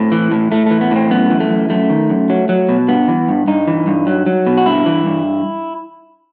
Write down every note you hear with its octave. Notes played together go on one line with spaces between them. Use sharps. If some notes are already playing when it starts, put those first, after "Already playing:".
Already playing: A2 C4
E3
A2
A2 A3
E3 A3
B3
A2 C4
F#2 B3
E3
A3
F#2
F#2 A3
D#3
F#2
F#3
F#3
B2
G2 B3
E3
G2
G2 D#4
E3
G2
F#3
F#3
B2
F#4
G2 E4
E3
G2